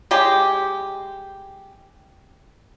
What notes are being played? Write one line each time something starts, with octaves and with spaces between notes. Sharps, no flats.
G#3 G4